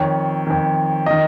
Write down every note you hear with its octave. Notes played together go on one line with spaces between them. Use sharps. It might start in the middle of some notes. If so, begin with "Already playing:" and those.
Already playing: F2 D#3 C#5
F2 D#3
D#3 D#5